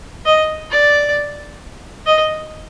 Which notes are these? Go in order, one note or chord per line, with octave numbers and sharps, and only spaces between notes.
D#5
D5
D#5